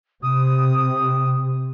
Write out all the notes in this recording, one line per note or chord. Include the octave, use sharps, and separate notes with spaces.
C3 D#6